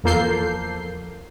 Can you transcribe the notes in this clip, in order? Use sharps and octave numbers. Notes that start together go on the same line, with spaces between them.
E2 F3 A#3 A4 G6 C7